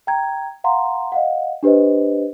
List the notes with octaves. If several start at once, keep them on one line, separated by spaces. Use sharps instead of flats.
G5 A#5 G#6
F5 F#5 A#5 C6
D#5 F5 F#5
D4 G4 B4 C5 D#5